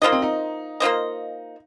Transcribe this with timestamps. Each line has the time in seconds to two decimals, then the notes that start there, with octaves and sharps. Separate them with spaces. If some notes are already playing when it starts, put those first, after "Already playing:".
0.02 A#3 D#4 F4 C5 D#5
0.12 C4
0.22 D#4
0.80 A#3 F4 C5 D#5